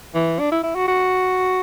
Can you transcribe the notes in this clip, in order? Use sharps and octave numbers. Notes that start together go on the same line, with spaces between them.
E3
D4
E4
E4
F#4
F#4